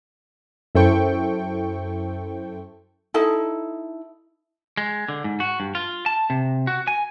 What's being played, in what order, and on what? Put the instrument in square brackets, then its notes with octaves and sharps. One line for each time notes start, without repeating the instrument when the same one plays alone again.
[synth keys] F#2 E4 A4 C5 G5 C#6
[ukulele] D#4 E4 A4
[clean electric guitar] G#3
D3
G#2
F#4
G2
F4
A5
C3
F#4
G#5